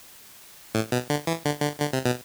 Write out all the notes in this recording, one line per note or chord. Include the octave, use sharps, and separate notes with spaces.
A2
B2
D3
E3
D3
D3
D3
C3
B2